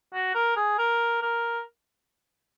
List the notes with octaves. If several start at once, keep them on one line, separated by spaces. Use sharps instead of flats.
F#4
A#4
G#4
A#4
A#4